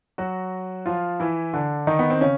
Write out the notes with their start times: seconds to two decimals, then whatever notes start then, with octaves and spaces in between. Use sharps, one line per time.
0.18 F#3 F#4
0.86 F3 F4
1.20 E3 E4
1.53 D3 D4
1.87 D#3 D#4
1.99 B3
2.10 C4
2.21 C#3 C#4